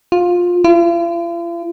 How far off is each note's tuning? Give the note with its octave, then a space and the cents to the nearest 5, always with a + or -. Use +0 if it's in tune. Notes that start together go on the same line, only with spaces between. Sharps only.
F4 +15
F4 -45